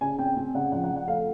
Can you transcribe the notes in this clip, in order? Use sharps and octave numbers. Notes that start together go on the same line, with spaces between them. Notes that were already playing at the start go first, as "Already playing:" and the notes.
C#3 G#5
C4 G5
C4
C#3 F#5
F3 F#5
F#5
F3
F#5
A3 F5